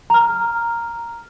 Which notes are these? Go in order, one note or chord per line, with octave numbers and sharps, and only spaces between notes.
A#5 F6